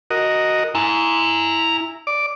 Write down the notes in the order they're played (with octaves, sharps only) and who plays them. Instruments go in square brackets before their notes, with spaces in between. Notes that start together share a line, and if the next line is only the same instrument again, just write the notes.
[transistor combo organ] F#4 A#4 D#5
[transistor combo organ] E4 [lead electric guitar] G#5 A#5
[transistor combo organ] D5 D6